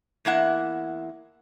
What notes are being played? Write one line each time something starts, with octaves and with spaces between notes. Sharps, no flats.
E2 A#3 E4 F#5